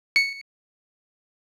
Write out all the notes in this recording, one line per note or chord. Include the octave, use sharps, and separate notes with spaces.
C#7